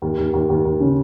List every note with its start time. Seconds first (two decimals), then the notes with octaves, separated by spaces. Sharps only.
0.02 D#2
0.18 D#2
0.33 D#2
0.50 D#2
0.65 D#2
0.80 C#3